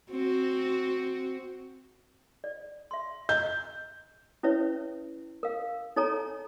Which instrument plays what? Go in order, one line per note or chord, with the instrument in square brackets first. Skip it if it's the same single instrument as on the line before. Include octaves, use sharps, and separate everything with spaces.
[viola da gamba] C4 F#4
[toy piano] D5
E5 C6
[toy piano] D#5 [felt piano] G6
[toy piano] C#4 E4 B4 C#5 E5
A#4 F5
D#4 A4 C#5 G#5 A#5